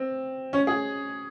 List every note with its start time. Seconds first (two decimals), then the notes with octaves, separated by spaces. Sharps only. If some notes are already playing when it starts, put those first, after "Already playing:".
Already playing: C4
0.53 C#4
0.67 G#4